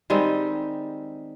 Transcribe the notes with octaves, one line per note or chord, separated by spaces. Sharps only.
D#3 G3 G#3 C4